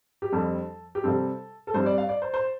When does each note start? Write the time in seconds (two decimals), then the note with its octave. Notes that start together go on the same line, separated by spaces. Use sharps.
0.22 G4
0.32 F2 D3 G3 C4 A4
0.95 G4
1.04 C3 G3 C4 A4
1.67 A4
1.74 G2 G3 C4 C5
1.86 D5
1.98 F5
2.09 D5
2.22 C5
2.34 C5